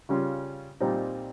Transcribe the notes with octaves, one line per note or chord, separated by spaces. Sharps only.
C#3 G3 C#4 F4
A#2 G3 C4 D#4